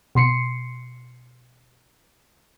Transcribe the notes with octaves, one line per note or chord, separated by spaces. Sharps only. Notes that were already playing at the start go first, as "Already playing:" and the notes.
B2 C6 C7 C#7